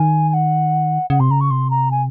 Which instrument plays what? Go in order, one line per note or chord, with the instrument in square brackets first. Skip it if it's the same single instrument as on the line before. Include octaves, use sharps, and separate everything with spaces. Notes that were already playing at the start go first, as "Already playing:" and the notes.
Already playing: [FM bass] D#3 [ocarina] G#5
[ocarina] G#5
F#5
[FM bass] C#3 [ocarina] F#5
[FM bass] C3 [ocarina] C6
[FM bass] C#3 [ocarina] A#5
[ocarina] C#6
[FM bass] C3 [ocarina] C6
[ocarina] A#5
G#5